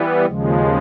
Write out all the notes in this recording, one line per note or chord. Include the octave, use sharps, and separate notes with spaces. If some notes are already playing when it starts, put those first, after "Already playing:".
Already playing: E3 G3 B3
D#2 C#3 F3 G#3